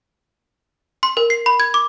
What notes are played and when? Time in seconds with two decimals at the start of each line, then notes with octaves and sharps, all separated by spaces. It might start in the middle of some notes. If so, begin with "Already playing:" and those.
1.03 C6
1.17 A#4
1.30 C7
1.46 B5
1.60 G#6
1.74 D6